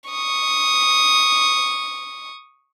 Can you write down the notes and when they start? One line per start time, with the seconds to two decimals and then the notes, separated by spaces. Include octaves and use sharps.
0.10 C#6 D#6